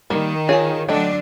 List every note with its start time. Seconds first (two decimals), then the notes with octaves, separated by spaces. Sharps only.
0.10 D#3 G3 A#3
0.49 F4 G#4 C#5 G#5
0.89 D3 F#3 A3 D4 D#5 G5